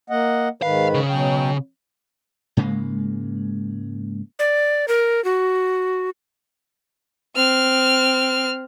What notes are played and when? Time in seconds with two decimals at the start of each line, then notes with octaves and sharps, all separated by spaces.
0.10 A#3 D#5 F#5
0.62 G#2 D#3 B4 F5
0.94 C#3
1.09 B2 F#3 G5
2.57 G#2 C#3 G#3 A#3
4.39 D5
4.88 A#4
5.24 F#4
7.36 C4 F6